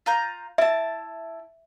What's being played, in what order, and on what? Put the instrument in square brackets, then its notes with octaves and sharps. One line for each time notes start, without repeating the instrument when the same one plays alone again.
[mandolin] F4 A#5 G6
[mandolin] E4 A5 [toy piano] E5